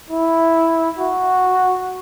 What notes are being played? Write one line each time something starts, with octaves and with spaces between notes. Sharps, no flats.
E4
F#4